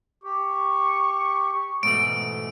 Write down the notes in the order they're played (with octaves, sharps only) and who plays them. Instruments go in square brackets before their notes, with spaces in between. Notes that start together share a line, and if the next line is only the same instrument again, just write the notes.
[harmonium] G4 [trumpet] C#6
[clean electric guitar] G#2 B2 A3 [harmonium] E3 [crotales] D7